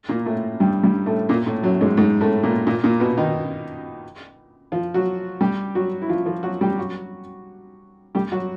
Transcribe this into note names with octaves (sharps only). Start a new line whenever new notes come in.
A#2 A#3
A2 A3
G2 G3
G2 G3
A2 A3
A#2 A#3
A2 A3
F#2 F#3
G#2 G#3
G#2 G#3
A2 A3
A#2 A#3
A#2 A#3
A#2 A#3
B2 B3
D#3 D#4
F3 F4
F#3 F#4
G3 G4
F#3 F#4
E4
F3 F4
F3 F4
F#3 F#4
G3 G4
F#3 F#4
G3 G4
F#3 F#4